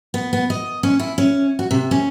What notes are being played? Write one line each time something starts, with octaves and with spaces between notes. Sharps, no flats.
B3
B3
D#5
C#4
E4
C#4
F#4
C3
C#4